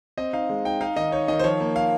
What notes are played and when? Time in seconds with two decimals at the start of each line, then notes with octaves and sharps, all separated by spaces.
0.17 C4 D#5
0.33 D#4 F5
0.49 G#3
0.65 D#4 G5
0.81 D#4 F5
0.96 D#3 D#5
1.12 D#4 C#5
1.28 D#3 D#5
1.39 C5
1.44 F3 C#5
1.60 A#3
1.76 F5